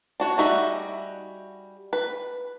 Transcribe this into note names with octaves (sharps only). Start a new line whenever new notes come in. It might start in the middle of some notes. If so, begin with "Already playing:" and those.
D4 F#4 C#5
G3 D#4 F#4 G#4 E5
B4